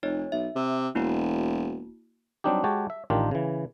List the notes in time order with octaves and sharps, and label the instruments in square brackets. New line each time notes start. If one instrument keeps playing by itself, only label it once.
[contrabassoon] F1 [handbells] D#4 C#5 D#5
[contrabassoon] B1 [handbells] E5
[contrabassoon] C3
[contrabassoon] E1 [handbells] A#3 E4 F#4
[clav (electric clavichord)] F#3 G3 C4 D4 D#4 G4
G#3 F#4 G4 C#5 A5
E5
A1 D#3 D4 F4 G4 A#4
C#3 E3